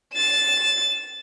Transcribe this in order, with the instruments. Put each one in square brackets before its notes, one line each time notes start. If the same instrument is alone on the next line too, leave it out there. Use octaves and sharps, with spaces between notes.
[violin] A6 E7